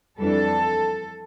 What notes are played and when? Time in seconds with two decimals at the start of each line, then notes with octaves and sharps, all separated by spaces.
0.18 F2 E3 G3 D4 A4